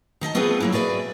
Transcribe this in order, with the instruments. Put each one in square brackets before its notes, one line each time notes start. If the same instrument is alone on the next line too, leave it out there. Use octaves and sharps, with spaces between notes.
[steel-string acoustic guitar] D#3 D#5 E5 A5
A3 B3 C4 F4 G#4 B4
F#3 A#3 E4
F#4 G#4 B4 D5 E5